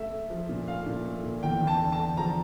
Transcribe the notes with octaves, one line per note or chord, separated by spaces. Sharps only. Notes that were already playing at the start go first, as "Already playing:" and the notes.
Already playing: A3 E5
A3
F3
A#2
A3 F5
A#2
A3
A#2
E2 G5
E2
A5
D3
A5
D3
F3 A#5